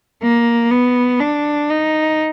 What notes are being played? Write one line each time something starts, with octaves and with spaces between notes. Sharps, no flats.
A#3
B3
D4
D#4